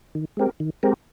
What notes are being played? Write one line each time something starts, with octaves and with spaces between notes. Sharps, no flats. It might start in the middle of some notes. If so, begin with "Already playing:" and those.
D#3
G#3 C4 G4 A#4
D#3
G#3 C4 G4 A#4